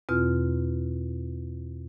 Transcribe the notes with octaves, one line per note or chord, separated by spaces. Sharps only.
E2 B2 C4 F4 F6